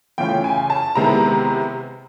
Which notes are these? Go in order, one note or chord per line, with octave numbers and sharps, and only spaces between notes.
C#3 E3 A3 C#4 F4 G5
G#5
A5
C3 D#3 G#3 B3 E4 A#5